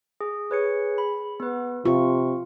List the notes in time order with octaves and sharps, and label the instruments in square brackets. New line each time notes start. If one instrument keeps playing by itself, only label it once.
[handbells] G#4
[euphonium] G#4 [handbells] B4 C#5 C#7
[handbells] B5
B3 B4
[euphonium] C3 [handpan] F4 [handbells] C#6